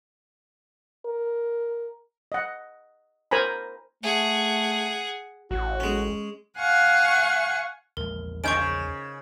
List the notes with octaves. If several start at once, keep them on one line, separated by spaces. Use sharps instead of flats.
A#4
D#5 F#5
A#4 C5 G#5 A#5 B5
A3 G#4 F#5
A1 F#4
G#3 C#4
F5 F#5 G#5 C#6
A#1 E2 G#3 A#4
C3 D#3 C#4 C#6 G6 D7
C#3